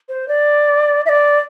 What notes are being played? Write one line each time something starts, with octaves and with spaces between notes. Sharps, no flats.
C5
D5
E5
D5